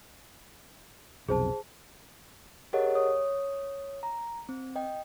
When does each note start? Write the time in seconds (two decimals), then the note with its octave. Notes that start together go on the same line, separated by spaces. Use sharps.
1.29 B1 F2 C3 G#4 C5 A5
2.73 G4 G#4 A#4 C#5 D#5 F#5
2.95 C#5 D#6
4.03 A#5
4.49 C4
4.76 D#5 G5